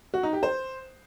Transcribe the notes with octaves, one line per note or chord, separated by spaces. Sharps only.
F#4
D#4
G4
C5